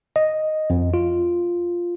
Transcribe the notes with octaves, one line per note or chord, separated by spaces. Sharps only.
D#5
F2
F4